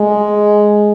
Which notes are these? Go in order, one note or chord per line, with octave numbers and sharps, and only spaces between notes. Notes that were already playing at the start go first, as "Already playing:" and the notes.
Already playing: G#3